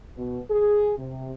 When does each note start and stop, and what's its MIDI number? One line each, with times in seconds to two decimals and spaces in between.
0.17 0.39 47
0.51 0.93 68
0.98 1.31 48